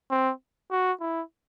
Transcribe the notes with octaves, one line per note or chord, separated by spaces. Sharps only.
C4
F#4
E4